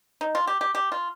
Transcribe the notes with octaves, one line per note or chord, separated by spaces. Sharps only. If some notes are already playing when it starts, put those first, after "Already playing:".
D#4
F4
G4
G4
G4
F4